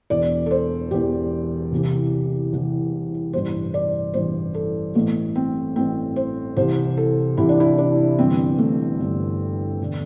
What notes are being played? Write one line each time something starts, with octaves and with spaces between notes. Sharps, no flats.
E1 E2 E3 D5
A4
C5
E1 E2 E3 G4
C2 C3 E3
C2 C3 E3
A1 G2 E3 C5
D5
A1 G2 E3 C5
A4
A1 A2 E3 A3
C4
A1 A2 E3 C4
C5
C2 C3 E3 C5
A4
C2 C3 E3 E4
D4
E4
D4
G1 G2 E3 C4
A3
G1 G2 E3
E1 D3